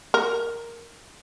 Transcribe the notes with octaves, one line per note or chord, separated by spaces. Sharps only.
A#4